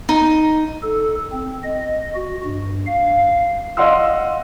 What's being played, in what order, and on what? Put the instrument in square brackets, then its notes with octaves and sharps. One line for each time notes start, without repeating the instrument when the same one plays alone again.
[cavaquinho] D#4
[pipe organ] A4
C4
D#5
F#4
G2
F5
[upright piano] D#5 F5 F#5 C6 E6